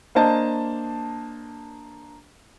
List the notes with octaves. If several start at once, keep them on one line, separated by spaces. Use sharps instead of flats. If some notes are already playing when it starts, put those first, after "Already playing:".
A#3 D4 C5 D#5 A5